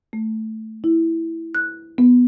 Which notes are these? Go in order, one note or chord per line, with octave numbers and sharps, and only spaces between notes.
A3
E4
F#6
B3